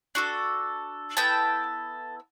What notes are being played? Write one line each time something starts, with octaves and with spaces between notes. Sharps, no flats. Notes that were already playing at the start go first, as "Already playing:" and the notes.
D4 F#4 A4
B3 E4 A4 G5 A5